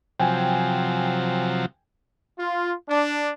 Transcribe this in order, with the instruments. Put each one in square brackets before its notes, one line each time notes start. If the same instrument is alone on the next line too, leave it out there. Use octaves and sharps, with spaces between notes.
[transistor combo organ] C3 F3 F#3 [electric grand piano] G5 G#5
[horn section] F4
D4